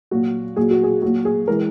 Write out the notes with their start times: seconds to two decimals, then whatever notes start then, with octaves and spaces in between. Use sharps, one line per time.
0.11 A#2 F#3 F#4
0.56 A#2 F#3 G#4
0.71 F#4
0.83 G#4
1.02 A#2 F#3 F#4
1.25 G#4
1.48 E3 G#3 A#4